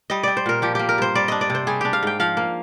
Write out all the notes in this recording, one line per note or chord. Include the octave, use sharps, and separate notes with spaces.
G3 D#5
C4 D5
C5
A#2 A#4
F3 G4
A#3 G4
A#4
G2 C5
G3 D5
D4 D#5
D5
C3 C5
G3 G#4
D4 G4
F5
G#2 G5
F3 F5
A#3